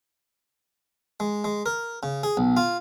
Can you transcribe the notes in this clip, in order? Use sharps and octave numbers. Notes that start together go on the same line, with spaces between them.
G#3
G#3
A#4
C#3
G#4
B1
F4